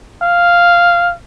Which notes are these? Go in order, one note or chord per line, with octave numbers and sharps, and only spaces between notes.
F5